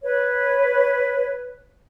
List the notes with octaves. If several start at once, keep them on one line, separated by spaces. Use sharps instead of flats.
B4 C#5